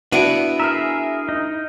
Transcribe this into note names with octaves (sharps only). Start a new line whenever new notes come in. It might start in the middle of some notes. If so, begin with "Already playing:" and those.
B3 D4 E4 F#4 D7 D#7
G#4 A#4 E5 A#5 F6
D#4